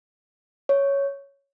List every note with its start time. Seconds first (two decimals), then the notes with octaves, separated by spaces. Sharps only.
0.69 C#5